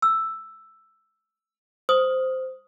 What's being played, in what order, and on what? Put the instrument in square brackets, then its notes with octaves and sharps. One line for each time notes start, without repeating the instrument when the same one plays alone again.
[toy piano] E6
[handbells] C5 [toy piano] D#6